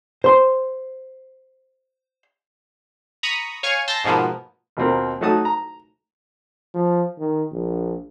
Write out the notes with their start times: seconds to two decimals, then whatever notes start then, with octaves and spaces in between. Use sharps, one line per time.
0.24 C5 C6
3.23 A#5 B5 C#6 D#6
3.63 C#5 F5 G#5 C#6 F6 G#6
3.88 A5 C6 E6 G6 A6 A#6
4.04 G#2 B2 F3 A#3 B3
4.77 D#2 B2 A#3 C4 F4 A#4
5.21 F#3 A3 D#4 F#4 A5 D#6
5.45 A#5
6.74 F3
7.18 D#3
7.52 A#1